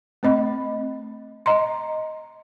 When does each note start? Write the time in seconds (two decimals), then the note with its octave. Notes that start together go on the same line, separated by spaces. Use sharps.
0.23 A3 C4 D#5 B5
1.46 D#5 A#5 C6